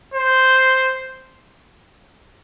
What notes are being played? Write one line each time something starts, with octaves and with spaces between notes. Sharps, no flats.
C5